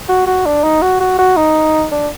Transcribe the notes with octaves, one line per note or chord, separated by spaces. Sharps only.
F#4
F#4
D4
D#4
F#4
F#4
F#4
D#4
D4